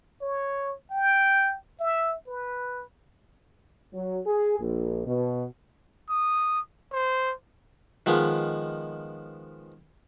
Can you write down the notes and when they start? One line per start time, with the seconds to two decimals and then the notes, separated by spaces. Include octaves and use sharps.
0.21 C#5
0.90 G5
1.80 E5
2.27 B4
3.94 F#3
4.26 G#4
4.59 A#1
5.06 B2
6.09 D#6
6.93 C5
8.06 D#3 F3 G#3 B3